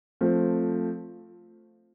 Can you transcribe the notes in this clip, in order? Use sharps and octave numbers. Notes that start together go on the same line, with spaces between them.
F3 A3 C4